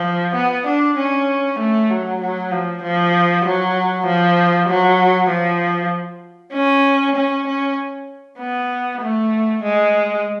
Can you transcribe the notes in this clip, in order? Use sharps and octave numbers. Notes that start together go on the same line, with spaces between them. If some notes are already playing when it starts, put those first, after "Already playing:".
Already playing: F3
B3
D4
C#4
A3
F#3
F#3
F3
F3
F#3
F3
F#3
F3
C#4
C#4
C#4
B3
A3
G#3